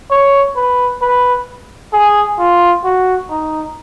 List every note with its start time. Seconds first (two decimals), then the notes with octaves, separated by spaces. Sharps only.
0.11 C#5
0.57 B4
1.02 B4
1.93 G#4
2.39 F4
2.84 F#4
3.30 D#4